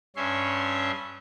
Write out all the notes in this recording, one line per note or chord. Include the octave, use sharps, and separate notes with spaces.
G2 C#4 C#5 E5 C6